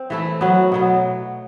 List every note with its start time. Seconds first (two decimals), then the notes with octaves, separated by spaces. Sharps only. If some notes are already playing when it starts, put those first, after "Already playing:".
Already playing: C4
0.10 E3 A3 E4
0.41 F#3 B3 F#4
0.72 B2 F#3 B3